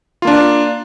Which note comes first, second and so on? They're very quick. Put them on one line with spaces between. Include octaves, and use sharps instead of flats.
F4 A#3 D4